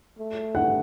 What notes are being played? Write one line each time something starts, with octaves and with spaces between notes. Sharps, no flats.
A3
F#5